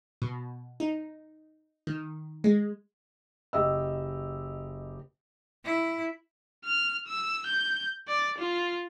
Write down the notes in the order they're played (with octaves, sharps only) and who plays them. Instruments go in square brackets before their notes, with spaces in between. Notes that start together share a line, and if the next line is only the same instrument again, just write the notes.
[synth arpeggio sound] B2
D#4
D#3
G#3
[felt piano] F#1 G4 D#5 E6
[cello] E4
[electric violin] F6
E6
G6
D5
F4